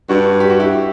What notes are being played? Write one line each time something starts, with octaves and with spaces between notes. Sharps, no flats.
G2 D4 F#4
G4
F#4
E4 G4